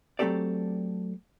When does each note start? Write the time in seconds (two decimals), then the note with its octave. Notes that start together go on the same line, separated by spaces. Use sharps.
0.19 F#3 A3 C4 G4 A4 D5